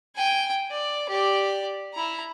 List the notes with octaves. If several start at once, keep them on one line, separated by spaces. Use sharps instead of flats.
G5 G#5
D5
G4 D5
E4 A#5